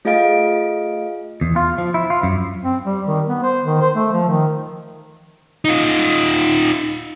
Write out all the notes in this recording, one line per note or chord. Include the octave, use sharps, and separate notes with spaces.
A3 F4 G#4 D#5 F5 D7
E2
F4
F3
E4
F4
F#2
C4
G3
D#3
B3
C5
D#3
C5
A3
F3
D#3
D#4 F4